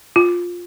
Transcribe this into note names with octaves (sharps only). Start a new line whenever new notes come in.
F4